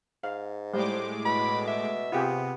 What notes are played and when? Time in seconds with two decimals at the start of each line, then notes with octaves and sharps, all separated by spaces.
0.23 G#2 F5
0.73 A2 G3 G#3 C5 D6
1.25 B2 B5
1.67 E5
2.12 C3 B3 F4 G4 G#4